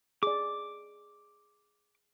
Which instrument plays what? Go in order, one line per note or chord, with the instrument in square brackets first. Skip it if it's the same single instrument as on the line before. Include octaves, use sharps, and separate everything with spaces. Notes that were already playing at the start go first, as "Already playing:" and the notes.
[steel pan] G#4 D5 [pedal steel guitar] D6